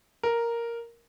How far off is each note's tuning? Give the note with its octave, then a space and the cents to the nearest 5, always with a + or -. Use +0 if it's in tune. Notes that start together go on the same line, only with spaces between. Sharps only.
A#4 +0